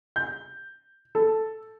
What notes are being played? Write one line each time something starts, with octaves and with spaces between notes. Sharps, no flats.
G6
A4